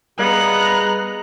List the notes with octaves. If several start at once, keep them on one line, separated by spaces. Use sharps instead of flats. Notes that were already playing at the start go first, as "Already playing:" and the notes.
G3 B3 G#4 D#5 F5 A#5 F#6